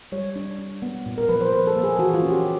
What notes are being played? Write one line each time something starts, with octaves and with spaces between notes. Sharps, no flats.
G3 C#5
D4
D4
B3
A#2
A#4
F3 B4
C5
F3 B4
A4
A#3
G#4
E3 F#4
F4
C#4
G4